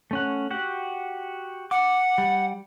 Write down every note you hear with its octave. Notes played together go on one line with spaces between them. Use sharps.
A3 C#4 F#5
F#4 G4 F#5
F#5 D6
G3